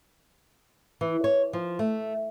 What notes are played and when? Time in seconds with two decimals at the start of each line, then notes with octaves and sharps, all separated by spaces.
1.01 E3
1.24 C#5
1.53 F3
1.79 A3